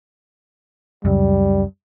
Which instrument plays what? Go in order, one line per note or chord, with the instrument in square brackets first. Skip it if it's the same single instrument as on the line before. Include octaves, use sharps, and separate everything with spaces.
[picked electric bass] C#2 F#2 [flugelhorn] G3